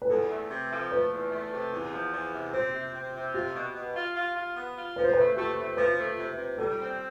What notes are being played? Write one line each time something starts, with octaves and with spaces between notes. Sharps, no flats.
B4
E2 A4
A3
C3
F3
A3 B4
E2
A3
C3
E2
F3
E2
C3
C4 C5
C3
C4
C3
F4 G4
B2
B2
F4
F4
F4
B3
F4
F3 B4
C5
B4
A3
A3 G4
A3
F3 B4
A3
C3
C3
G3 A4
C4